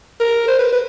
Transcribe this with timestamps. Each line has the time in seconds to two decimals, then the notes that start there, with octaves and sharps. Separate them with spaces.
0.20 A#4
0.48 C5
0.59 B4
0.73 B4